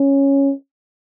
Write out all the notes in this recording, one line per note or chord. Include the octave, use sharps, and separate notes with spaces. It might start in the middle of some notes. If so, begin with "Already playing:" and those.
Already playing: C#4